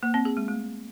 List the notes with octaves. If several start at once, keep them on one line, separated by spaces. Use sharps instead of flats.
A#3
C4
G#4
G#3
A3